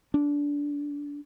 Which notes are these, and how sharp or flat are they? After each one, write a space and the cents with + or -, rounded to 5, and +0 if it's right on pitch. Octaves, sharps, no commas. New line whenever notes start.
D4 -20